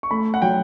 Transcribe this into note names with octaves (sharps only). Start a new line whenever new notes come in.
C#6
A3 B5
F#5
F#3 G5